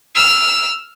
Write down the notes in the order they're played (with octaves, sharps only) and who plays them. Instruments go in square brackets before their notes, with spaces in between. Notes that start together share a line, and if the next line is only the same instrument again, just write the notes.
[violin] E6 F6